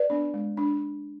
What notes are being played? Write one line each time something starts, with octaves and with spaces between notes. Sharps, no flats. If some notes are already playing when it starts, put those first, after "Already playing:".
Already playing: B4 D5
B3 D4
G#3
D4